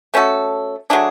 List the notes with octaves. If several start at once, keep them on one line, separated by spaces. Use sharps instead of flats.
A3 C#4 F#4 A4
F#3 A3 D4 G#4